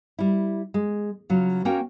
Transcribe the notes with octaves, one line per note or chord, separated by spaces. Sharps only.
G3 E4
G#3
C#3 F#3 F4
A#3 C#4 F#4 A#4 G5